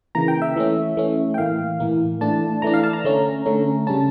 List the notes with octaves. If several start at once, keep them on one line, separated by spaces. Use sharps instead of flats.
C#3 E3 A#3 A#5
G5
E5
E3 A3 C#4
E3 A3 C#4
G5
A2 E3 A#3 F5
A2 E3 A#3
E3 A3 D4 A5
E3 A3 D4 A#5
F5
A5
A#5
D3 A3 C#4
D3 A3 C#4
C#3 G3 C#4 A5